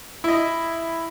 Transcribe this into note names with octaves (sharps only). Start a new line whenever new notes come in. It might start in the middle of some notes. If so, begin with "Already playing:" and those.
E4 D#5